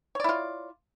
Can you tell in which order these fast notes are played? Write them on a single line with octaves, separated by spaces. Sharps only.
C#5 D5 E4 F4